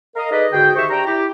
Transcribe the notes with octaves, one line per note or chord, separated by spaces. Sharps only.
A#4 D#5 F5
D#4 G#4 A4 B4 D5 D#5
G#2 D3 F#4 G#4 G5
D#3 G4 C5 E5 C#6
D4 G4 G5 A#5
E4 G4